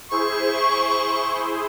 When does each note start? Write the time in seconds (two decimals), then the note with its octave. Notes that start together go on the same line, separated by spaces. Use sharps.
0.11 E4 G#4 C5 C#6